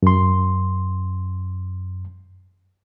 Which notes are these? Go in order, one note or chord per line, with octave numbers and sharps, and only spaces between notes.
F#2 C6